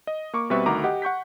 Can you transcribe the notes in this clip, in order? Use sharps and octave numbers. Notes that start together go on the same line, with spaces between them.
D#5
A#3 C#6 D6
B2 G3 C4 B4 E5 C#6
D2 D#3 F#4 A#5 D6
G4 D#5 F#5
F#5 C#6 G6 B6